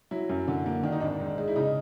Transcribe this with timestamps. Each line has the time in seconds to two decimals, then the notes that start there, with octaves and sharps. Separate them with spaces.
0.11 F#3 E4
0.29 F#2
0.48 D3
0.66 A#3
0.83 D#3 D4
0.92 D#4
1.01 G#1 D4
1.20 G#2
1.38 G#3
1.48 E4
1.56 C#3 D#4